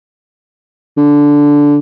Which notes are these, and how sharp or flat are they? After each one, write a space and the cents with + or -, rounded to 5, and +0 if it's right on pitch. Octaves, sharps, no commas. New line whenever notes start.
D3 -10